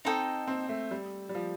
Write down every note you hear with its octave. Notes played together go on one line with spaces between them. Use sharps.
C4 D#4 A4 D#5 G5
C4
A3
G3
G3
F3